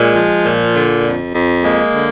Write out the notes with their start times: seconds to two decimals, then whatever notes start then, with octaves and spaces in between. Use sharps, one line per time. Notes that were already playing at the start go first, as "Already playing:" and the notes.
Already playing: A#2 G#3
0.15 F3
0.45 A#2
0.74 D3
1.05 F2
1.34 F2
1.63 G#3 A#3
1.92 D3